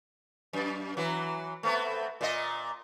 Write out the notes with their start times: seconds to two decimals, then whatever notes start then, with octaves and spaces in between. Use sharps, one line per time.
0.53 F#2
0.97 E3 F#3
1.63 A3 B3 C4
2.21 A#2 A#3 D#5